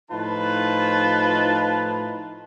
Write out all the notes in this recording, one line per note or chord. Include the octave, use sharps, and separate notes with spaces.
A2 F3 D#4 F4 B4 A5